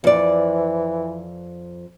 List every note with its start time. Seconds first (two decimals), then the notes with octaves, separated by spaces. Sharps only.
0.04 F2 E3 D5